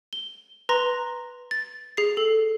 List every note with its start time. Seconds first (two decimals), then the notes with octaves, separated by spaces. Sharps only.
0.13 G7
0.69 B4 A#5 C6 A#6
1.51 A6
1.97 G#4 C7
2.17 A4